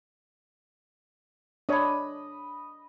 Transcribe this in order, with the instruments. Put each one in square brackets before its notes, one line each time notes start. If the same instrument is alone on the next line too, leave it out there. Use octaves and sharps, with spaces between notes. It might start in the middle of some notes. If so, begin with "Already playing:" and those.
[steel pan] D4 C#5 [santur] D#5 B5